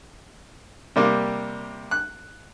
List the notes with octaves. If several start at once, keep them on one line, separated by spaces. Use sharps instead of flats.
C3 G3 A#3
F#6